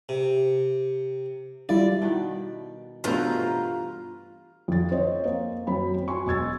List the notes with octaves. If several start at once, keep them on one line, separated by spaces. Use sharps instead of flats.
C3
G3 E4 F4 D5
B2 D#3 B3
G2 B2 E3 A3 F4 B4 C5 A#5
F2 F3 A6
C4 C5 C#5 D#5
A#3
F#2 F#3 C4 B5
F#4 G#5 C6 C#6
E1 D#5 E6 G#6 A6